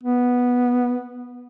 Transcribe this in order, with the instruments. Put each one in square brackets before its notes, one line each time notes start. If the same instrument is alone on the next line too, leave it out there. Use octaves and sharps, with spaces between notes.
[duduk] B3